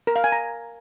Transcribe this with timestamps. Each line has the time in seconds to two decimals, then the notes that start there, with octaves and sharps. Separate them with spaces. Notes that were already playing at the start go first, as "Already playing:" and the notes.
0.07 A#4
0.16 F5
0.24 G#5
0.32 A#5